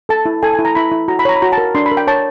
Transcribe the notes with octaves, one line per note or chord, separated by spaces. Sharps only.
A4 A5
E4
A4 G#5
G#5
E4
A#5
E4 B5
E4
F#4 A#5
B5
C#5 A#5
B5
F#4 A#5
A5
A#4
D4 C6
B5
A#4
G5
C#5 A5